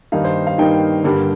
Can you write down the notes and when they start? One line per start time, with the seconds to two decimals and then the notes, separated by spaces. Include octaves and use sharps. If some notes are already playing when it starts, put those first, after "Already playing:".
0.12 G2 D#3 A#3 D#4 F5
0.24 C5
0.47 F5
0.58 G2 D#3 A#3 D#4 G5
1.04 G2 D3 G3 A#3